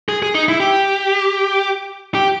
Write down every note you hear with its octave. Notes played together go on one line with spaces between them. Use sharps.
G#4
G#4
D#4
E4
G4
G4